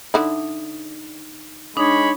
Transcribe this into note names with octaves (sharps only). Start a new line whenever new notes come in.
D3 D#4 E4
G#3 D4 D#4 C#5 B5